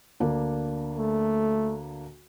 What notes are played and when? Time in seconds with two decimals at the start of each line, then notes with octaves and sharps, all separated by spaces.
0.20 D2 A#3 D4
0.97 A3